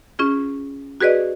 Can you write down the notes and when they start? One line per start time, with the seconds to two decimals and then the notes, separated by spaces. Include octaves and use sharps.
0.19 C#4 F4 G#4
1.01 F#4 G#4 B4 D5 D#5